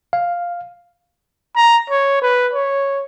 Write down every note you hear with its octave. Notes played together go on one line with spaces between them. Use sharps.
F5
A#5
C#5
B4
C#5